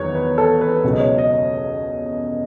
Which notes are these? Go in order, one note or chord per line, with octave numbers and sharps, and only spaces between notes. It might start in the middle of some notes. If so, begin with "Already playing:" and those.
Already playing: E2 D#3 F#3 B4 C#5
B4
A4
B4
C#2 B2 F#3
D#5
C#5
D#5